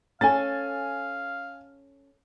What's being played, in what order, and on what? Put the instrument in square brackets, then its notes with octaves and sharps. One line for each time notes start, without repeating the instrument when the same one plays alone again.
[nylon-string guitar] C#4 A4 [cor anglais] F5 [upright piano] G#5 A6